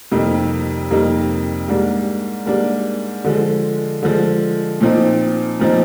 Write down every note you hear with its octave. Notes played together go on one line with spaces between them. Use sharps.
F2 C3 G3 A#3 D#4
F2 C3 G3 A#3 D#4
G#2 G3 A#3 D4
G#2 G3 A#3 D4
D3 F3 G#3
D3 F3 G#3
A#2 F3 C4 D#4
A#2 F3 C4 D#4